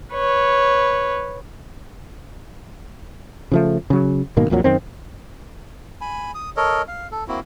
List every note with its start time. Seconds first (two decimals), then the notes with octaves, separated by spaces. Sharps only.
0.13 B4 C#5
3.52 C#3 F3 A3
3.90 C#3 F#3
4.37 G#2 B2 D#3 A#3
4.50 A#1 F2 A#2 F#3
4.64 F#2 D#3 C4
6.01 G#5 B5
6.35 D#6
6.57 A4 A#4 C#5 D#5
6.88 F5
7.12 A4
7.28 A#3 C4 E4 F#4